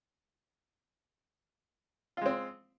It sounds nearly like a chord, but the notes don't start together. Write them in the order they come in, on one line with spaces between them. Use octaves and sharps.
F4 G#3 C4